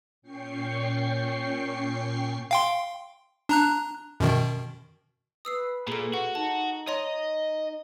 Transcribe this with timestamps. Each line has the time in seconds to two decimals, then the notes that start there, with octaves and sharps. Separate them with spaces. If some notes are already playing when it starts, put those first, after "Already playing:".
0.22 A#2 C#4 G5 C#6 C7
2.51 F5 G5 C6
3.49 D4 A#5 F#6
4.20 F#2 B2 D#3
5.45 B4 D#6 E6 C7
5.88 A#2 G#4 A4
6.14 F#4 F#5
6.35 D#4 A5
6.87 C#5 D#5 A#5 C6